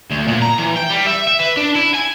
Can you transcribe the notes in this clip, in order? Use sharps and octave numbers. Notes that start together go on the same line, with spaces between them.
D2
A#2
A#5
E3
G5
G3
E5
E5
B4
D4
E4
G#5